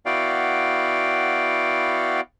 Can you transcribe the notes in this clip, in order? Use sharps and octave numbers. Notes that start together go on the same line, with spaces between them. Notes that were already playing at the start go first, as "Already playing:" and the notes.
B3 E4 F#4 D5 F5 G5